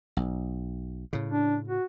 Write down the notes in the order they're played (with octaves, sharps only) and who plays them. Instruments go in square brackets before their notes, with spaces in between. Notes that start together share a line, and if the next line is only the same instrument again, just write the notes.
[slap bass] B1
A2 C#3
[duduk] D4
F#4